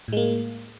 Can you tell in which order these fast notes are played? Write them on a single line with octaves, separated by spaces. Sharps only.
A2 G#3 A#3